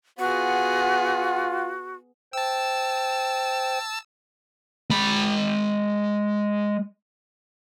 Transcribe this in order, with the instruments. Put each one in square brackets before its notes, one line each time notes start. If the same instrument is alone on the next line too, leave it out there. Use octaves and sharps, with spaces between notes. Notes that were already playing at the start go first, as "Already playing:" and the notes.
[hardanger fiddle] B3 G#4 [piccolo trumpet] F4 [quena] F#4 [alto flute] F#5
[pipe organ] C5 G5 [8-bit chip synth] A5 E6
[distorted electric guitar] G#3 B5